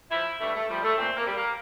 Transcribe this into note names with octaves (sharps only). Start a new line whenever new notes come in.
F3 E4
G2 A3
A3
F3 G3
A3
A#2 C4
A#3
G3
A#3